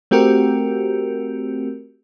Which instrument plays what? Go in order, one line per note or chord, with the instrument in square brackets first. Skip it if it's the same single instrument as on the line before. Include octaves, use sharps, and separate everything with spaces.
[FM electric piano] A3 C4 F#4 G4 A#4